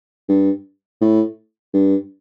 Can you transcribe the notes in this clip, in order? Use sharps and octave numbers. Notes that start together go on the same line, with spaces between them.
G2
A2
G2